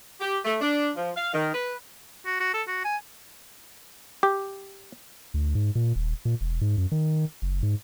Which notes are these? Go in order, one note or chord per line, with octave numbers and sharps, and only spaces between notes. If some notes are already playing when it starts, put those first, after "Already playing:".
G4
A3
D4
F3
F5
D#3
B4
F#4
F#4
A4
F#4
G#5
G4
D2
G#2
A#2
D#1
A#2
E1
G#2
F#2
D#3
F#1
G#2